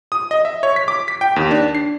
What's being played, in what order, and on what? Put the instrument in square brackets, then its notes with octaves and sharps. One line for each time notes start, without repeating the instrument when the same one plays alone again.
[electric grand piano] D#6
D#5
E5
C#5
B6
D6
B6
G5
D#2
D4
C7